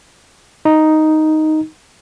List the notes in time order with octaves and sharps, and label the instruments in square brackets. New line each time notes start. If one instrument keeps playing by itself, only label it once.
[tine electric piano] D#4